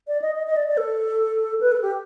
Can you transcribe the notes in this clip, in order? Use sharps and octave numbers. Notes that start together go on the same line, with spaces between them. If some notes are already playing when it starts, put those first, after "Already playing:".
D5
D#5
D#5
D#5
D5
D5
A4
B4
A4
G4